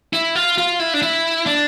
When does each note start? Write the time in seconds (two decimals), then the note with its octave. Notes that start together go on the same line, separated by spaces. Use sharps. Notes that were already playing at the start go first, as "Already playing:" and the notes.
0.13 E4
0.35 F4
0.58 F4
0.80 E4
0.94 D4
1.02 E4
1.46 D4